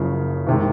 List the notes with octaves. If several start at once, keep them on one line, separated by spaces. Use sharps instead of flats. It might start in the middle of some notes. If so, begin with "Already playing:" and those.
Already playing: F#1 F#2 C#3 F3
F#1 C3 D#3 G#3